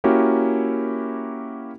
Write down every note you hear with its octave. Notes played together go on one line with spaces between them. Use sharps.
A#3 C#4 E4 F#4 G4 A#4